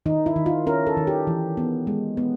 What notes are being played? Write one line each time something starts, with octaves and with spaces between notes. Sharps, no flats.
D#3 D#4
E4
D#3
F4
C#4 A#4
A4
D#3
G4
E3
B3
G#3
B3